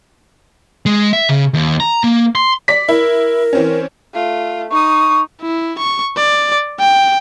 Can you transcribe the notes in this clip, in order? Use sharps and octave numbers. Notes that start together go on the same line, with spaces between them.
G#3
E5
C#3
D#2
A#5
A#3
C6
D5 B6
E4 A#4
E3 C4 C#4
A3 F4
D#4 C#6 D#6
E4
C#6
D5
G5